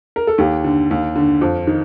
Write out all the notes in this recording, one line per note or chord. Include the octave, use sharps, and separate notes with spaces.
A#4
A4
D#2 G4
D3
D#2
D3
F2
D#3